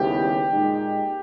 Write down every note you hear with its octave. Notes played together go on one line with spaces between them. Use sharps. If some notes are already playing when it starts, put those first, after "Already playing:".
Already playing: D#2 C#3 G3 B3 E4 G4
A#2 G#3 D#4